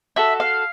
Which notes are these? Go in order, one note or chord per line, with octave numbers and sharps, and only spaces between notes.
F#4 A4 E5
F5